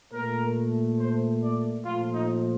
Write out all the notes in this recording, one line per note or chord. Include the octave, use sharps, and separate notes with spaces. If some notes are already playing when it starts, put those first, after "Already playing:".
A#2 A3 A#4
C5
D5
A#2 F3 A3 F4
D#4